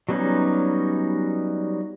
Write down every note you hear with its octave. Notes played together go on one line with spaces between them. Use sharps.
F#3 G3 B3 C#4 D#4